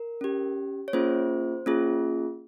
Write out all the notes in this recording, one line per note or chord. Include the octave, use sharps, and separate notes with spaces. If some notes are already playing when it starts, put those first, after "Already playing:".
Already playing: A#4
C#4 G4
C#5
A#3 C#4 F4 G#4 C5
A#3 C#4 F4 G#4